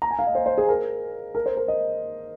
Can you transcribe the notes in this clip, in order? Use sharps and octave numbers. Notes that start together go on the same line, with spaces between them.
A#5
G#5
F5
D#5
C5
C5
G#4
A#4
A#4
C5
A#4
D#5